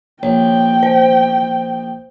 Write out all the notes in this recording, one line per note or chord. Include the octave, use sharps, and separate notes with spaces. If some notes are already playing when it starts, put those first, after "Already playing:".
A#1 C#5 G5
C5